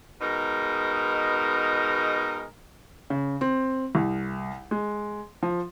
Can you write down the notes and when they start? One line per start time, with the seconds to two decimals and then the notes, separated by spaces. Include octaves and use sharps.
0.20 B2 G#3 D#4 A#4
3.10 C#3
3.41 C4
3.95 C2
4.71 G#3
5.43 F3